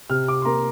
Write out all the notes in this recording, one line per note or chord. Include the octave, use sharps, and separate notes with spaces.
C3 F6
D6
C6
A#3 A#5